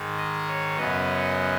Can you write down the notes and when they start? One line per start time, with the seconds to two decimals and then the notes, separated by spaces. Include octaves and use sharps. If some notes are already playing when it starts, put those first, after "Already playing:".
Already playing: G#2 D#3 G#3
0.17 D#5
0.47 C#5
0.77 F#2 C#3 F#3 B3 D#5